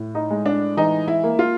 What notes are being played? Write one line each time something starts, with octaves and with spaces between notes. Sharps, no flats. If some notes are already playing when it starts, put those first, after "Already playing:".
Already playing: A2
D#4
G#3
D4
E3 D#4
E4
A#3
F4